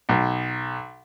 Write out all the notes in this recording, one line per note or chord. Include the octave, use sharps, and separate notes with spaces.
B1